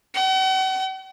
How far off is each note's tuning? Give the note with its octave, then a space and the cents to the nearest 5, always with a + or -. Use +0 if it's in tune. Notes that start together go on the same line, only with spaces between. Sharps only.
F#5 +45